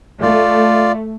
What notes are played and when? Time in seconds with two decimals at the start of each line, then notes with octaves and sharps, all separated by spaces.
0.22 A3 F4 D5